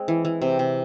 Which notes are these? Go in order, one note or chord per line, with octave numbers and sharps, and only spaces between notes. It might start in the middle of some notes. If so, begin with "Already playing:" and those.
Already playing: G#3 C4
E3
E3
C3
C3